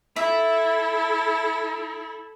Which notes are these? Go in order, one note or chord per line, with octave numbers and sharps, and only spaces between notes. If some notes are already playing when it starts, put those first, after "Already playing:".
E4 A4 E5